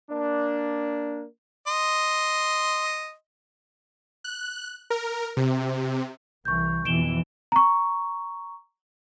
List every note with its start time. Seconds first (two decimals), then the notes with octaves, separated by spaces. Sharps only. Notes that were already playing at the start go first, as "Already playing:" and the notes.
0.11 A#3 D4
1.67 D#5 C6
4.24 F#6
4.90 A#4
5.37 C3
6.45 C2 E3 C#6 G6
6.85 F2 B2 E3 D7 E7 G7
7.52 A#5 C#6